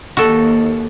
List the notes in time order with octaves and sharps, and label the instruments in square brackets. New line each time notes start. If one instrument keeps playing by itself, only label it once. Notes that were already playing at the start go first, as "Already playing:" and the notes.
[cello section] D#2 [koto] F#4 A4